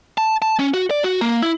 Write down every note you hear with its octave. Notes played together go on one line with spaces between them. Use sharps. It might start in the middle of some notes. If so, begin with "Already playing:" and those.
A5
A5
C#4
F#4
D5
F#4
A#3
E4